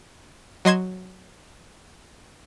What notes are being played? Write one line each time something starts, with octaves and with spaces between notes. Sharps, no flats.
F#3 D#5 C6 G#6 E7